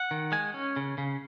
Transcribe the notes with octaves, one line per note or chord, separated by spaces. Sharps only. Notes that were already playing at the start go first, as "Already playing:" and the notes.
Already playing: F#5
D#3
G#3 G#5
C#4
C#3
C#3